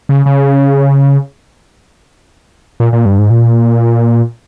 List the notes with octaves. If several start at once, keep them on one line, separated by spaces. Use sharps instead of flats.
C#3
C#3
A#2
A#2
G2
G#2
A#2